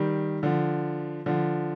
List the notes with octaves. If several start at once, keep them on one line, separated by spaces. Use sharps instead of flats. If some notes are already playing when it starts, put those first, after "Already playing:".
Already playing: D#3 G3
D3 F3
D3 F3